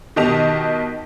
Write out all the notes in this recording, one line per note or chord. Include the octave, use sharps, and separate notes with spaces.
B2 D#3 G4 D#5 A5 F7